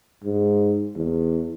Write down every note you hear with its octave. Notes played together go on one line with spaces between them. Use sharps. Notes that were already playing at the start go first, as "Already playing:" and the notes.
G#2
E2